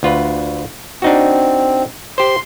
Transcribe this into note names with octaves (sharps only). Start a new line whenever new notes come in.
D2 F4 B4
C4 D4 D#4 F#4
G4 C5 C6